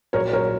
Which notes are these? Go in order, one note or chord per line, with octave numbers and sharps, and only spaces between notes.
A#1 A#2 F#3 A#4 C#5
A#4 C#5